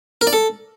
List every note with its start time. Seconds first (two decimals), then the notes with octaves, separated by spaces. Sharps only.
0.21 A#4
0.27 D5
0.33 A4